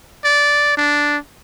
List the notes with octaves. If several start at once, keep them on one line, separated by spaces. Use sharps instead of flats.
D5
D4